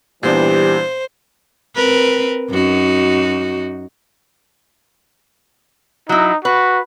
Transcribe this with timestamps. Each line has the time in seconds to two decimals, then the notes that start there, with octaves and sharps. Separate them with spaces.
0.23 A#2 E3 G3 B3 D4 G4 C5
1.76 C4 A#4 B4
2.50 F#2 D#4 F#4
6.09 F#3 D#4 E4
6.45 F#4 B4